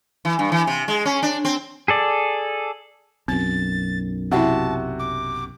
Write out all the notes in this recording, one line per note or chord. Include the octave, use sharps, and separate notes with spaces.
E3
G2
E3
C3
G#3
C#4
D4
C4
G#4 A4 D5
B1 F#2 C4 A6
C3 E4 F#4 E5 G5 A5
D6